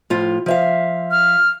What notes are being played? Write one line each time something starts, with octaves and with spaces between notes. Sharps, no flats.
A2 F3 F4
F3 E5 F5
F6